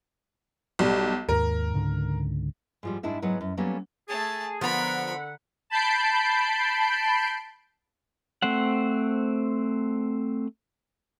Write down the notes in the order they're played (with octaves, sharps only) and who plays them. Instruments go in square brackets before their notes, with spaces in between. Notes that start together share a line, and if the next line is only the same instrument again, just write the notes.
[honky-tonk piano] B1 G3
[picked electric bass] D#2 G#2 [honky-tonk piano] A#4
[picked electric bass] C#2 G#2 D3
[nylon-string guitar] G#2 F3 G3
G#2 D4 E4 E5
G#2 F#3 B3 B4 F#5
F#2
F#3 G3 A#3 B3 C#4 A4
[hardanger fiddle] A3 A5 [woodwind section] G#4
[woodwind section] D3 F#5 [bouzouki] F3 B3 A#5 [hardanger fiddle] A#4 B5
[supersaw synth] A5 B5 G6 C7 D7
[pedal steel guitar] A3 C4 C5 F#5